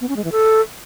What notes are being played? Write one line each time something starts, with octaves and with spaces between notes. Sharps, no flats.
B3
C#4
G#3
E3
A4